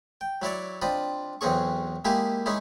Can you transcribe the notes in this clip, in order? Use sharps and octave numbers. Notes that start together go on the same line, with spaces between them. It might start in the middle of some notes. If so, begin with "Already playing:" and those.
G5
F#3 E4 C#5 D5
C4 D4 F4 D#5 B5
B1 E2 C4 C#4 G#4 C#6
G#3 A#3 E4 G4 G#4
G#3 C#4 D#4 E4